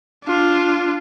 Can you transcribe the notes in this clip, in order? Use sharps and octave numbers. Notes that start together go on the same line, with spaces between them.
D4 F4